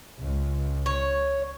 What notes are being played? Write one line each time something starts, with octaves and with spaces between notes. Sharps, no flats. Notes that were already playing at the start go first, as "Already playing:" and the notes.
C#2
C#5